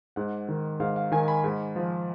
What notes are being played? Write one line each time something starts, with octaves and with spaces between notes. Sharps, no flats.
G#2 F#5
D#3
G#2 F5
F5
D#3 G#5
B5
G#2
F3